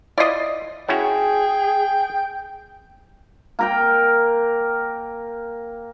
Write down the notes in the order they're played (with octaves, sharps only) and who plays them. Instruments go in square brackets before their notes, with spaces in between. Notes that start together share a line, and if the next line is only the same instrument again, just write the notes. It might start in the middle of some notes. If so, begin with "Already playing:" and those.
[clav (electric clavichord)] E4 F4 [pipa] D5 D#5
[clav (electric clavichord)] C#4 E4 F#4 [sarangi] G#4 [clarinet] G5
[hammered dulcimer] A#3 A#4 G5